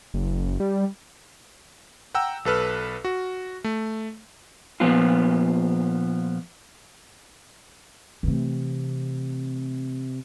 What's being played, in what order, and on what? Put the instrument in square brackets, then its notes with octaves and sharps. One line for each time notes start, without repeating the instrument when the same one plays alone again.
[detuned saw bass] F#1
G3
[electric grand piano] F#5 G5 A#5 E6
B1 A4 B4 F6
F#4
A3
[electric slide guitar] A#2 F3 B3 F4
[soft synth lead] C3 [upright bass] E3 A3